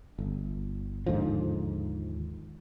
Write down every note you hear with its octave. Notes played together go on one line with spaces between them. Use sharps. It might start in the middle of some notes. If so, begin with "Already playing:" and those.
G1
D#2 G#2 D3 F3